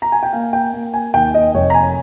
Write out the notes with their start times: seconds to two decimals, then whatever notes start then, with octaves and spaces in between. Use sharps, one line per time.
0.02 A#5
0.12 G#5
0.23 G5
0.33 A#3 F5
0.53 G5
0.73 A#3
0.94 G#5
1.14 D#2 G5
1.34 D#5
1.54 F1 C#5
1.70 A#5
1.74 G#5